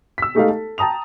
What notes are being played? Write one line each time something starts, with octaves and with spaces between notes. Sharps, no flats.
E6 B6
G#3 A3 D#4 G4 A4 F5
A4
G5 A5 A#5 D#6 F7